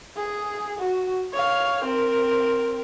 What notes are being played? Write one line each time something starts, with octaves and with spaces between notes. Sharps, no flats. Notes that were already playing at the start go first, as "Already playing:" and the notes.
G#4
F#4
C#5 F5
C4 A#4